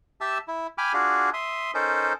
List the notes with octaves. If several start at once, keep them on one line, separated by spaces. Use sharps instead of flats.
G4 E5 A5 E6
E4
G5 G#5 B5 D6 F6
D4 F4 F#4 G#4
E5 C6 D#6
C#4 D#4 A4 A#4 C5